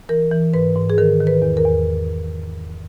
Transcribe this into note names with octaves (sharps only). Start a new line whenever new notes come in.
E3 A#4
E3
G#2 B4
G#2
G#4
D#3 A#4
D#3
B4
E2
A#4
E2